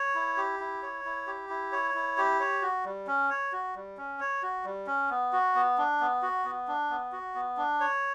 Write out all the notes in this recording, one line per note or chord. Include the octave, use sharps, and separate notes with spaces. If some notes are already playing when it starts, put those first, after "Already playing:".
Already playing: C#5
E4
G4
E4
C#5
E4
G4
E4
C#5
E4
G4
C#5
F#4
G3
C#4
C#5
F#4
G3
C#4
C#5
F#4
G3
C#4
B3
F#4
B3
D4
B3
F#4
B3
D4
B3
F#4
B3
D4
C#5